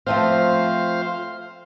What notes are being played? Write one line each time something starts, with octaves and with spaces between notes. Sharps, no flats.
F3 A3 C4 C5 F5